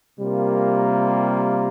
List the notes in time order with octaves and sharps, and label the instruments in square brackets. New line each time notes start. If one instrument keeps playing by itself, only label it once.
[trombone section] C3 G3 A#3 F4 A#4